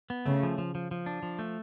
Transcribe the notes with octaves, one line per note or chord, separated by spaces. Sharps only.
B3
C#3 A3
F3
F3
F3
F3
D4
F3
A3